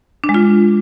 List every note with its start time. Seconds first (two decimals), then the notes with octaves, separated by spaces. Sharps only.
0.24 D4
0.29 G#3
0.34 F4